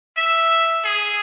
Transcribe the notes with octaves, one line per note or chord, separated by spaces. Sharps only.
E5
G#4